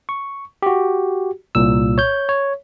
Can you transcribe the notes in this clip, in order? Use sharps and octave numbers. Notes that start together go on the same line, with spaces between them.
C#6
F#4 G4
C2 A#2 E6
C#5 G6
C#5